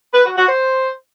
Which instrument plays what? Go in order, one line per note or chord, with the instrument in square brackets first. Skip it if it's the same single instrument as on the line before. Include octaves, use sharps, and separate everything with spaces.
[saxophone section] B4
F#4
F#4
C5